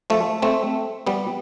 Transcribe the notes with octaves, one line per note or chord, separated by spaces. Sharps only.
F3 A3
A3 C4
G3 B3